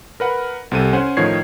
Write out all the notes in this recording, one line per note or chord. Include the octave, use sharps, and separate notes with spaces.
A#4 B4 F#5
C2 C3 A4 D#7
C#4 C5 F#5 G#5
A2 D#3 F3 C#5 G#6 C7